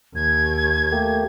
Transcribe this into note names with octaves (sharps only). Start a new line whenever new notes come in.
D#2 G#6
A3 A#3 G4